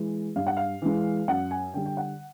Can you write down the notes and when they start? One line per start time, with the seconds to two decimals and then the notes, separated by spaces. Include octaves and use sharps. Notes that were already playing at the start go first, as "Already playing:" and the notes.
Already playing: E3 G#3
0.36 G2 F5
0.47 F#5
0.57 F5
0.82 E3 G#3
1.28 F#2 F#5
1.51 G#5
1.74 D3 G3 G5
1.86 G5
1.97 F#5